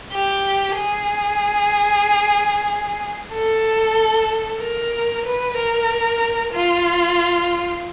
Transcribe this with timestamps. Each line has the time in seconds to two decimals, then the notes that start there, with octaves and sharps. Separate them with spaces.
0.12 G4
0.76 G#4
3.33 A4
4.61 A#4
5.25 B4
5.57 A#4
6.53 F4